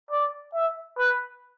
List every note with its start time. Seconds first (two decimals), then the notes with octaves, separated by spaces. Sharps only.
0.11 D5
0.54 E5
0.98 B4